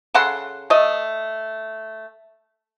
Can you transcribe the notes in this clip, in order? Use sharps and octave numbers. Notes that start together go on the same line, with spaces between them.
C#3 A4 F#5 C6
A3 D#5